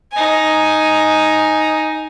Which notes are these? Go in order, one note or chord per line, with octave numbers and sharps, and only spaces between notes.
D#4 G#5